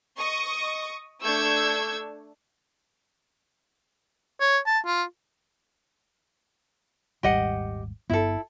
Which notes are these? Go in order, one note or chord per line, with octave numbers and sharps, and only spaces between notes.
D#5 C#6 D#6
A3 D4 C#6 E6 G6 G#6
C#5
A5
F4
D#1 G#1 G3 G4 D#5 F#5
G1 G2 B3 E4 A4